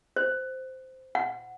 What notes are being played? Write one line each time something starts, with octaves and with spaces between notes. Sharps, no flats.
C5
F#5